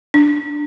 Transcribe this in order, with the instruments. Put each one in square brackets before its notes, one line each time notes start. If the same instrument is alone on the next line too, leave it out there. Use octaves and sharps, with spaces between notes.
[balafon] D4